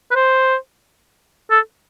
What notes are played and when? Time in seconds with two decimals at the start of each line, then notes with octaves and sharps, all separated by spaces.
0.11 B4
0.15 C5
1.51 A4